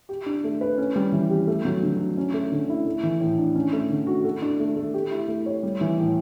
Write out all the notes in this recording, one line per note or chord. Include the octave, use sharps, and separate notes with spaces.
G4
D4
A3
B4
C#4
G3
E3
G4
A3
F#3
D3
D4
C#4
A3
D3
E4
A3
E3
A2
D4
C#4
A3
D3
F#4
A4
D4
A3
A3
G4
E4
A3
C#5
G3
E3
A2